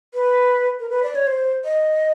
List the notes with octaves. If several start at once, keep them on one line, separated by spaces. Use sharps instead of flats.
B4
A#4
B4
D5
C#5
C5
D#5